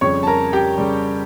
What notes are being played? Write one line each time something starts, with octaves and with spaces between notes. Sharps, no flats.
F2 C#3 G3 C#5 C#6
A5
A#4 A#5
G4 G5
C#3 G3